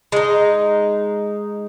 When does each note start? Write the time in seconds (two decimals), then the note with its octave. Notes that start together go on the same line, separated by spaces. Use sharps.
0.12 G#3 D#4